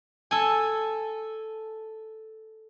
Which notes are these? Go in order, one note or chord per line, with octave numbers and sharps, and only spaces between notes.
A4 G#5